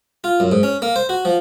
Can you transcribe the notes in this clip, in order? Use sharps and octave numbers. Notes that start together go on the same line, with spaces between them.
F4
F#2
G#2
C#4
A#3
C5
F#4
F3